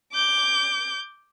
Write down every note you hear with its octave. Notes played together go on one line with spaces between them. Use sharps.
D6 G6